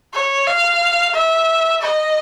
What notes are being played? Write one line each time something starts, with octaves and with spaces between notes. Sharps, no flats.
C#5
F5
E5
D#5